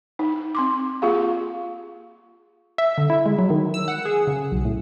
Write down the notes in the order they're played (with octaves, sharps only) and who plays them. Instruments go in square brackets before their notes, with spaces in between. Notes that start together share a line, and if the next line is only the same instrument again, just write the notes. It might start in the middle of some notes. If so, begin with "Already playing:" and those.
[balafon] D#4
C4 C6 D6
A#3 F4 G4 G#4 F5
[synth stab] E5
D3
E4
G#3
F#3
D#3
E6
F#5
G#4
C#3
B1
A2